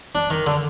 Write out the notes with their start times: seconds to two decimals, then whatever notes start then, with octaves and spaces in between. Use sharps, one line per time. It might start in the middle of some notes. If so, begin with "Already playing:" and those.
0.15 D4
0.30 D#3
0.46 D3